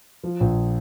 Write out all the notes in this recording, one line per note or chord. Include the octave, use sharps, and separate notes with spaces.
F3
A#1